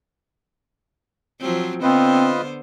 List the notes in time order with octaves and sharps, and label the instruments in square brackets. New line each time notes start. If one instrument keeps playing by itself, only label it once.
[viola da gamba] F3 F#3 C4
[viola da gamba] D3 B3 C5 [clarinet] C4 [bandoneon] F4 B4 D#5